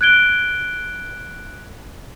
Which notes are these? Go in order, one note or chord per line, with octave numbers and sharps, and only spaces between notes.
F#6 G#6 D7 G7